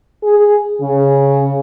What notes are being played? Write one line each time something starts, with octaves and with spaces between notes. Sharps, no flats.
G#4
C#3